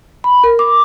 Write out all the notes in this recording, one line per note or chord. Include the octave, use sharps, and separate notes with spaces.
B5
A#4
D6